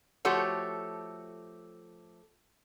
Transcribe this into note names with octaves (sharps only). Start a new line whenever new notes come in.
F3 A3 F#4 G4 A4 C#5